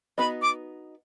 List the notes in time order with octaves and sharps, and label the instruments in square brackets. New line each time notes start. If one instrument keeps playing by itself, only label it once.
[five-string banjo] B3 D#4 F#4 B4 D#5 [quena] B5
[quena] D6